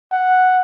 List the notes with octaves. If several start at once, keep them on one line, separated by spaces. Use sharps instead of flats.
F#5